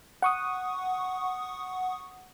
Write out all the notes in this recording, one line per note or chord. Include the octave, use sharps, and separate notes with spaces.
F#5 C#6 D#6